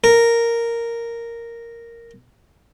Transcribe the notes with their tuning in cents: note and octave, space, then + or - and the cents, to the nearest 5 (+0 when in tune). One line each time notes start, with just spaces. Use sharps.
A#4 -5